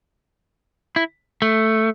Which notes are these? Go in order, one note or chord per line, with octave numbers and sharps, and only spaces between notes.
E4
A3